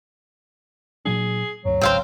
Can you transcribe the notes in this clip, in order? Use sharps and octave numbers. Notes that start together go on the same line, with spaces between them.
A#2 F#3 D4 G#4
D2 G2 F#3
G#1 C#2 C#3 C4 C5 F5 G5